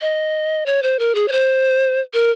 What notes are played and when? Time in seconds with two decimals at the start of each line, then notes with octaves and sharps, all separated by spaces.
0.01 D#5
0.66 C#5
0.83 C5
0.99 A#4
1.15 G#4
1.28 C#5
1.32 C5
2.14 A#4